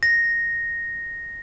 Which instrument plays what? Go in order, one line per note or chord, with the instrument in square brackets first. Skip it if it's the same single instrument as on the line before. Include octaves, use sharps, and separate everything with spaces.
[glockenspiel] A#6